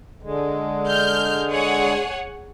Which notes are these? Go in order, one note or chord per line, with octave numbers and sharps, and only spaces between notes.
D3 G#3
F6 G6
G#4 C#5 F#5